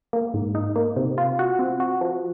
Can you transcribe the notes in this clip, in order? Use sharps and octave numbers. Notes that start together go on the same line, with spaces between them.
A#3
G#2
D#4
A#3
C3
F4
F#4
C4
F#4
F3